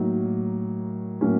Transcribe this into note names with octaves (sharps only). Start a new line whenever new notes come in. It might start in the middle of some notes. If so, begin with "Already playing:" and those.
Already playing: A2 F#3 A#3 D#4
A2 F#3 A#3 C#4